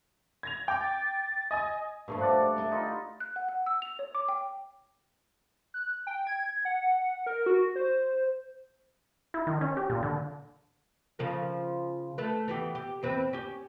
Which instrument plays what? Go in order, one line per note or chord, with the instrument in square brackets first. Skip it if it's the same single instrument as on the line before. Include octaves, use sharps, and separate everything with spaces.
[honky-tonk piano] G#6 A#6 F7
[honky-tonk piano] G5 D6 [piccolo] G6
[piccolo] A6
[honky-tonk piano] D#5 G#5 D#6
[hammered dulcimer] G2 A3 [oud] A#2 C#3 F3
[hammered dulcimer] D5 F#5
[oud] A#4 D#5 E5
[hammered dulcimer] D#4 F4 B5
[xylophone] F#6
F#5
F#5
E6
F7
C#5
D6
G5
[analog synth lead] F#6
G5
G#6
F#5
A#4
F#4
C5
[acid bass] E4
D#3
C#4
G4
A#2
D3
[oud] C#3 F3 A#4
A3 B4
E3 B3 G4
G4
E2 C4 B4
C#4 G4